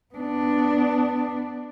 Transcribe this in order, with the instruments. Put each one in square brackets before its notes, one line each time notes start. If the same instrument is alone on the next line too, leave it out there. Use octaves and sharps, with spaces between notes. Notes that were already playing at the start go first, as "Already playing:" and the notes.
[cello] B3 D4